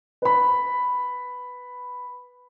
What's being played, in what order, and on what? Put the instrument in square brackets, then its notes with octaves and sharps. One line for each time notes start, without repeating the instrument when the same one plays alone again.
[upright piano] B4 B5